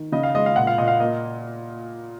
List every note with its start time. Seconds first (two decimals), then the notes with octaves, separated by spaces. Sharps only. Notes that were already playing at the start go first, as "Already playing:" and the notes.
Already playing: D#3
0.12 C#3 D#5
0.23 F5
0.35 G#3 D#5
0.46 F5
0.56 A#2 F#5
0.67 F5
0.78 A#2 D#5
0.88 F5
1.00 A#3 D#5